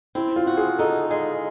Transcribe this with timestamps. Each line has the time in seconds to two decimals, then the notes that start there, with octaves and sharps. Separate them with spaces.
0.15 C4 E4
0.36 F4
0.47 F#4
0.57 G#4
0.78 D#4 A4
1.11 G#3